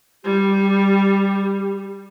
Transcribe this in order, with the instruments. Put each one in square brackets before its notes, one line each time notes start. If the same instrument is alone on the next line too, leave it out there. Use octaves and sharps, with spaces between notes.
[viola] G3 [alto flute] G4